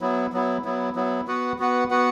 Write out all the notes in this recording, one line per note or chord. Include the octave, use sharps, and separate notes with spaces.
F#3 B3 E4
F#3 B3 E4
F#3 B3 E4
F#3 B3 E4
B3 F#4 B4 F#5
B3 F#4 B4 F#5
B3 F#4 B4 F#5